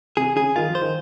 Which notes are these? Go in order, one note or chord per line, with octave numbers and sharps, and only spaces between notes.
C3 G#4
C#3 G#4
D#3 F4
F3
C5
D#3